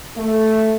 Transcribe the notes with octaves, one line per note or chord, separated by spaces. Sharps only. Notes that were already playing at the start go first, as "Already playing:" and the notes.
A3